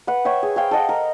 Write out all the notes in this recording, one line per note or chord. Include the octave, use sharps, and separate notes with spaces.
B4 F#5
C#5 E5 G5
G#4
G#4 C5 F5 G5
A4 D#5 F#5
A#4